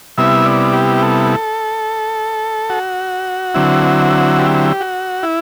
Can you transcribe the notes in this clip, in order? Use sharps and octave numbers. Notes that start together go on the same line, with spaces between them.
C3 G3 B3 E4 E5
D5
G4
A4
F#4
D3 F#3 C4 E4
G4
F#4
E4